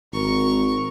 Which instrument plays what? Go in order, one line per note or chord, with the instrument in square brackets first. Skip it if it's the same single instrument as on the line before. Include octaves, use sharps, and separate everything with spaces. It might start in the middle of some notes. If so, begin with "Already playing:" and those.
[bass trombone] G#1 [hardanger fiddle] A#4 C#6